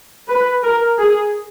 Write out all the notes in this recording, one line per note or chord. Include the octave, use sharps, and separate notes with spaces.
B4
A#4
G#4